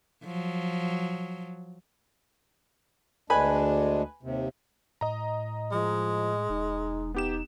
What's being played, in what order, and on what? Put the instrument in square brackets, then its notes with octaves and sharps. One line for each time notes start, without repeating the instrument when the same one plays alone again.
[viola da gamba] F3 F#3
[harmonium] D2 G#3 D4 [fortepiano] B4 G#5 B5
[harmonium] D#2 C3
[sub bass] A2 [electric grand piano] D#5 A#5
[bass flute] F3 [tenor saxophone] G#3
[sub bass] E1 [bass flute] D#4
[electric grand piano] B3 G4 E7 [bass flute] D#4